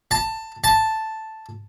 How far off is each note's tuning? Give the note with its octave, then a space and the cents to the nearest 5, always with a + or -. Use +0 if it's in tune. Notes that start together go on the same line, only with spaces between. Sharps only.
A5 +15
A5 +0